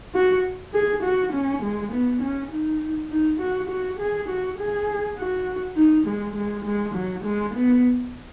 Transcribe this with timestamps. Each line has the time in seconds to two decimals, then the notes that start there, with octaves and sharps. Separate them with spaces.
0.15 F#4
0.74 G#4
1.03 F#4
1.33 C#4
1.63 G#3
1.92 B3
2.22 C#4
2.51 D#4
3.11 D#4
3.40 F#4
3.70 F#4
4.00 G#4
4.29 F#4
4.59 G#4
5.18 F#4
5.77 D#4
6.07 G#3
6.36 G#3
6.65 G#3
6.95 F#3
7.25 G#3
7.55 B3